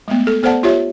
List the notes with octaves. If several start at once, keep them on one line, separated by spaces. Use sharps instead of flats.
G#3 A3 B3
A4
B3 A4 C5 D5 F#5 A5
F4 G4 C#5 E5